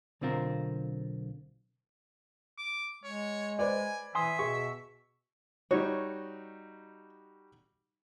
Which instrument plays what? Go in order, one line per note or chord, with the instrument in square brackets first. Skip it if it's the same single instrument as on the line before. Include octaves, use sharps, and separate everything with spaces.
[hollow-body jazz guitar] B1 D3 C4 F4 A#4
[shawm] D6
[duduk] G#3 [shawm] C#5
[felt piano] B4 C5 D5 [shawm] G#5
[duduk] E3 [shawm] E5 [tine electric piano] G#5 C6 D#6
[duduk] B2 [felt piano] G#4 [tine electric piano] C#6
[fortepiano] G3 D#4 F#4 [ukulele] C#5